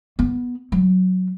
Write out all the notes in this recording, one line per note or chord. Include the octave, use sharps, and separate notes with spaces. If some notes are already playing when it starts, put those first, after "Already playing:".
B3
F#3